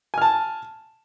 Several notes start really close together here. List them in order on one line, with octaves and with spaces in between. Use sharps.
G#5 F6 A5